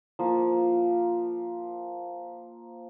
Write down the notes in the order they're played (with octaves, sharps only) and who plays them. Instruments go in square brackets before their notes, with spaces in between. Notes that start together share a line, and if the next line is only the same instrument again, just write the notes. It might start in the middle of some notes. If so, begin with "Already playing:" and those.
[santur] F3 A#3